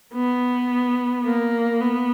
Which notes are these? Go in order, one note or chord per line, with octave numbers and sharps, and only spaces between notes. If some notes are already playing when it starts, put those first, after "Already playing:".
B3
A#3
B3